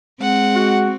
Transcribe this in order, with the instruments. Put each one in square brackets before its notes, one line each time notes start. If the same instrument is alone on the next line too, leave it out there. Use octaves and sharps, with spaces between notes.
[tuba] G#3 [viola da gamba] C4 [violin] F#5
[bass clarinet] F#4